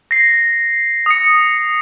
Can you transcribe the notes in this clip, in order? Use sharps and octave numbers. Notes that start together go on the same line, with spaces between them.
A#6 C7
D#6 C#7